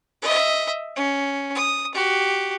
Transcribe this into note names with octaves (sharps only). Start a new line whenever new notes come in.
D#5 E5
C#4
D#6
F#4 G4